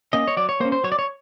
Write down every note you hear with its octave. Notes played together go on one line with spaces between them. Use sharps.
A#3 C#4 D#5
C#5
F#3 D5
C#5
A#3 C#4 C5
C5
F#3 C#5
D5
C#5